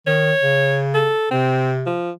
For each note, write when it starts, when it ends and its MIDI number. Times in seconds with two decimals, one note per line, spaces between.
0.07 0.32 51
0.07 0.82 73
0.43 1.11 49
0.95 1.29 69
1.31 1.96 48
1.31 1.72 60
1.86 2.11 53